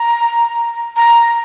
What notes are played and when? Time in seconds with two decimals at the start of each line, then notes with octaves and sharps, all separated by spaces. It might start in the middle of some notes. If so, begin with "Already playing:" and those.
Already playing: A#5
0.96 A#5